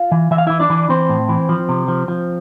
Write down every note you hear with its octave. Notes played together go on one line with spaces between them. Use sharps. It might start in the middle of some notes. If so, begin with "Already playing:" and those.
Already playing: F4 F5
E3
E3 E5
F5
E3 E4 E5
D4 D5
E3
E3 C4 C5
A2
E3
F3
C3
F3
F3